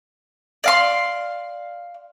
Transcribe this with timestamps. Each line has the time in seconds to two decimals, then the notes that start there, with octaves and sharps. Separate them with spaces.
0.64 D5 F5 C6